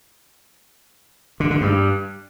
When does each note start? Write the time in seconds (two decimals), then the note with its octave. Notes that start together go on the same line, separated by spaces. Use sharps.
1.40 D3
1.51 D3
1.61 G2